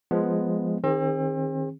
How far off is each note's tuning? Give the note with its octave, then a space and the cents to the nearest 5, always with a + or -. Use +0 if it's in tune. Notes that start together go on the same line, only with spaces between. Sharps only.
F3 +0 G#3 +0 B3 +0
D#3 +0 C4 +40 G#4 -35